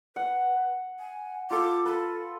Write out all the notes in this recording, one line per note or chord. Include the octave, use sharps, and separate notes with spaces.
B4 F#5
G#5
F4 A4 D6
A4 B4